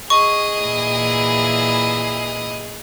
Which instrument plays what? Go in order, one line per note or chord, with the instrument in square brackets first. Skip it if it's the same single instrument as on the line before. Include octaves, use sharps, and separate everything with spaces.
[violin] G#4 [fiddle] D#5 [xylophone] C#6
[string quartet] A#2 E3 E4